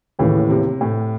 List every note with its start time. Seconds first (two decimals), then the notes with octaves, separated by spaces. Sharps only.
0.19 D#2 A2 C#3 E3
0.50 C3
0.81 A2